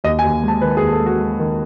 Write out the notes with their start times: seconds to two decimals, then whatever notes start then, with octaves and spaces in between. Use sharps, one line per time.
0.04 D#2 D#5
0.19 G#5
0.24 D#2
0.43 G#3 A5
0.62 D#3 B4
0.77 G#4
0.81 D#2
0.92 A4
1.01 G#3
1.06 F#4
1.20 G#3
1.39 D#3